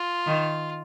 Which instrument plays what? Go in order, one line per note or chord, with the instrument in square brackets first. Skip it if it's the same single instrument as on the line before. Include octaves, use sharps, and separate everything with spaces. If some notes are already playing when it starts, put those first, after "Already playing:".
Already playing: [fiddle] F4
[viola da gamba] D#3